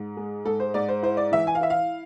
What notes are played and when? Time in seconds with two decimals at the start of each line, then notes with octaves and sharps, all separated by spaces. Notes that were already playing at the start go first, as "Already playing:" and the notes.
Already playing: G#2
0.17 G#3
0.45 G#2 A4
0.60 C5
0.74 G#2 D5
0.89 C5
1.03 E4 C5
1.17 D5
1.32 E3 E5
1.47 G#5
1.55 F5
1.61 E4 E5
1.70 F5